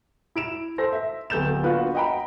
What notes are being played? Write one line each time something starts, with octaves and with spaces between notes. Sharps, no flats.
E4 D7 E7
A4 C5 A#6
E5
D1 B3 A4 G6 A6 E7
A#3 B3 D4 F4 F#4 B4
D#5 F#5 G5 A#5 B5